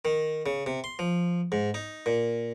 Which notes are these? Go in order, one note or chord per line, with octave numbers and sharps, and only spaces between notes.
D#3
C#3
C3
C6
F3
G#2
D#4
A#2